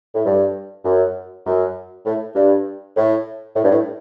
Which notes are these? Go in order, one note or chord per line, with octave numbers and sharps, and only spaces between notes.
A2
G2
F#2
F#2
A2
G2
A2
A2
G2
A2